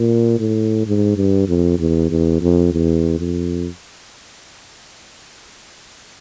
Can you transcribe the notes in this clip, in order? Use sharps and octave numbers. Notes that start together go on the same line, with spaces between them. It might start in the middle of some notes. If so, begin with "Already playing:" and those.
Already playing: A#2
A2
G#2
G2
F2
E2
E2
F2
E2
F2